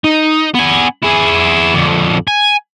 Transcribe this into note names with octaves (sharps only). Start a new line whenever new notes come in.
D#4
B3 G#5
E4 G#4
F2 D3
G#5